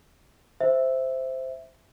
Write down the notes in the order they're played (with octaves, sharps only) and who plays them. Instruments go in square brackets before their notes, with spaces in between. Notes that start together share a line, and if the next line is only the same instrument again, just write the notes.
[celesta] C5 E5